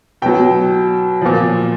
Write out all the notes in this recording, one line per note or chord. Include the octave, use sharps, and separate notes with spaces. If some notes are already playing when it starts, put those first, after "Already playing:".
B2 F#3 G5
A#2 F3